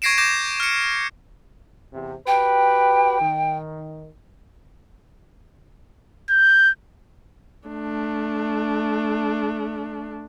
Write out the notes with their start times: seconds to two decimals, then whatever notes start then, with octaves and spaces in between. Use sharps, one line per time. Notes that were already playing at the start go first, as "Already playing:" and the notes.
0.02 C#6 G#6 A#6 C7 D7 E7
0.18 D6 G6 A#6 E7
0.60 F6 C#7
1.93 E2 C3
2.27 F#4 G4 B4 G5
3.21 D#3
6.30 G6
7.68 A3 D4